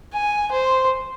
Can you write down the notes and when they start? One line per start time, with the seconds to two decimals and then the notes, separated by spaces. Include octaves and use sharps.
0.13 G#5
0.52 C5